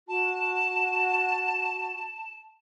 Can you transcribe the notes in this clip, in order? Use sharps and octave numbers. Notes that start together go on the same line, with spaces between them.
F#4 A5